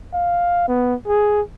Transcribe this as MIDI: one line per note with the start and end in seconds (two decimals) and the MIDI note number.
0.14 0.68 77
0.68 0.94 59
1.07 1.41 68